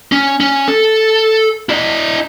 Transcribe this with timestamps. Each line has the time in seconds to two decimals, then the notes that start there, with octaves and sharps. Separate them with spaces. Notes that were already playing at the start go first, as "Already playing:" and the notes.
0.12 C#4
0.40 C#4
0.68 A4
1.69 E4 D#5